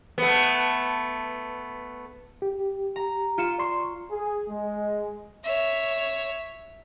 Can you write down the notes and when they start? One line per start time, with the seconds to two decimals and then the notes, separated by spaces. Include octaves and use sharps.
0.18 A3 B3
2.42 G4
2.96 A#5
3.38 F4 C#7 E7
3.58 D5 C6 C#6
4.11 G#4
4.49 G#3
5.44 C#5 E5